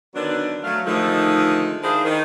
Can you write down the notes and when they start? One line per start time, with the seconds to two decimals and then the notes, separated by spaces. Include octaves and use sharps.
0.15 D3 D#3 F#3 B3 D4
0.64 F#3 A3 F5
0.86 D3 D#3 F3 G#3 A3 D#4
1.84 D#3 D4 E4 G#4 C5 F5
2.05 D#3